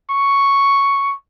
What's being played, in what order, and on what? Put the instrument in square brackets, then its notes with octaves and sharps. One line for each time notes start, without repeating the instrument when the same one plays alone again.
[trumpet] C#6